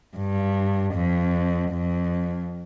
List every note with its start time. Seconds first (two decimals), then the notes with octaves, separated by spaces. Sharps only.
0.17 G2
0.94 F2
1.72 F2